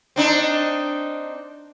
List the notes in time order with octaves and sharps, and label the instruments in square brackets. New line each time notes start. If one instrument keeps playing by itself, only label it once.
[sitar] C4 D4 D#4